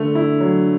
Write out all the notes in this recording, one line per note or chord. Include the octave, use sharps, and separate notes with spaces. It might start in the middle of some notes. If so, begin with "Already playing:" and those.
Already playing: D3 A3
E4
F#3